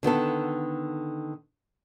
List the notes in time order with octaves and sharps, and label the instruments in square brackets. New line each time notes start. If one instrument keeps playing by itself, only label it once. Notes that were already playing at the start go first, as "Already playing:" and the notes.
[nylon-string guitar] D3 D#3 B3 A4